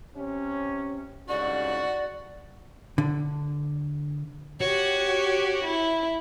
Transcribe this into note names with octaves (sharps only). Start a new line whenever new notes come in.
C3 C#4
C2 G#2 C#3 F#4 D5
D3
F#4 G4 C#5
E4